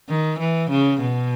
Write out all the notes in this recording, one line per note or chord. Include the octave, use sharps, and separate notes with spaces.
D#3
E3
C#3
B2